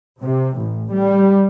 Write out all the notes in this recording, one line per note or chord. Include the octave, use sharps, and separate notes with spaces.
C3
A1
G3